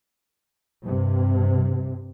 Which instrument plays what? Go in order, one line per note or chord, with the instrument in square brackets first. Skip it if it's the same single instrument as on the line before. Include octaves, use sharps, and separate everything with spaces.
[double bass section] G2 C3